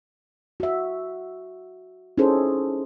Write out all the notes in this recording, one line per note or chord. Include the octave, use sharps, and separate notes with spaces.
F#4 E5
C#4 D#4 E4 G#4 A4 C5